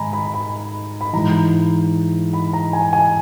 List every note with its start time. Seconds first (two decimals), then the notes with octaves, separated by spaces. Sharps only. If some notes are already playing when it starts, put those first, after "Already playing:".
Already playing: G#2 D#3 G#5 A#5 B5
0.13 B5
0.34 B5
1.01 B5
1.13 G#2 E3 A#5
2.34 B5
2.53 A#5
2.73 G#5
2.93 G#5